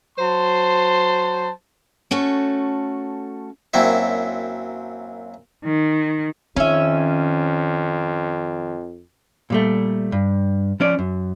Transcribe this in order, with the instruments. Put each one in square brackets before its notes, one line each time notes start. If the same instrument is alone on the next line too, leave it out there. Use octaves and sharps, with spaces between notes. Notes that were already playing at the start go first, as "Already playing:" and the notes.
[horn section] F#3 C5 A5 C6
[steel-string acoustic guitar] A3 C#4 F#4 A4
[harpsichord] F#2 A#2 F#3 C4 E4 E5
[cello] D#3
[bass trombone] F2 [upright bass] D#3 [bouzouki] C#4 E5
[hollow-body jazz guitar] A#2 G3 A3
G2
F3 C#4 D5
F#2